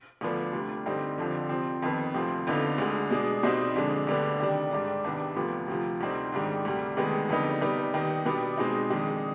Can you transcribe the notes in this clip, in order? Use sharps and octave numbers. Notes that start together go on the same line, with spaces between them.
D2 D3 F3 B3 D4
D2 C3 G3 D4
G2 D3 G3 C4 D#4
F2 D3 F3 C4
C3 F3 C4
F2 D#3 B3
D2 C3 F3 C4
F2 D3 F3 B3 D#4
D2 D3 G#3
B2 G#3 D4
C2 B2 G3 C4 D#4
F2 D3 G#3 D4
D2 D3 G3 B3 D4
C3 D#3 G3 D4
G#2 G3 D4
C2 C3 D#3 B3 D4
D2 C3 F3 B3
D2 C3 F3
D2 C3 G3 C4 D#4
G#2 D#3 G3 D4
D2 C3 G3
D2 C3 D#3 G#3 B3
F2 D3 G3 B3 D#4
C3 G3 B3 D#4
D#2 D#3 B3 D#4
B2 G3 B3 D4
B2 G#3 C4 D#4
F2 D#3 G#3 D4